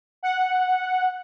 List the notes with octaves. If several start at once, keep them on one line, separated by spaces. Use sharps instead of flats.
F#5